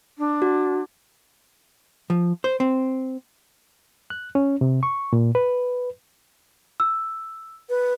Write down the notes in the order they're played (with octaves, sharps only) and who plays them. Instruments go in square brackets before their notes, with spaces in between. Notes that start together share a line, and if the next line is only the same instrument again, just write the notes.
[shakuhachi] D4
[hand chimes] F#4
[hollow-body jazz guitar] F3
C5
C4
[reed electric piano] F#6
C#4
C3
C#6
A#2
B4
[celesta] E6
[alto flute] B4